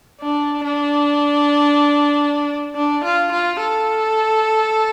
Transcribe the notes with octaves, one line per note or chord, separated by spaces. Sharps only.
D4
D4
D4
F4
F4
A4